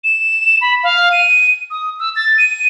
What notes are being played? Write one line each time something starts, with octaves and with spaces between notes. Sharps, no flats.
E7
B5
F5
D#7
D#6
E6
A6
D#7